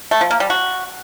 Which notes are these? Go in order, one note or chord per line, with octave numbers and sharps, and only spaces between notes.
A3
F3
A#3
G3
F#4